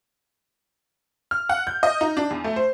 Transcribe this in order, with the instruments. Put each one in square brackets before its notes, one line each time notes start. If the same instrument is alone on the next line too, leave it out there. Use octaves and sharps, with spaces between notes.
[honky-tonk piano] F6
F#5
G6
D#5
D#4
D4
E2
A3
C5